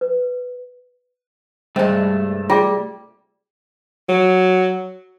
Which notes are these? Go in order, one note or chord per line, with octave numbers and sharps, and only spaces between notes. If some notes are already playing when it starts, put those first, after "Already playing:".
B4
G2 C3 G#3 A3
G3 F4 G#4 D5
F#3